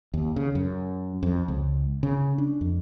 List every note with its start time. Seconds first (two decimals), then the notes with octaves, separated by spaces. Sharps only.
0.14 D#2
0.36 C#3
0.55 F#2
1.23 F2
1.48 C#2
2.03 C#3
2.38 D4
2.61 F2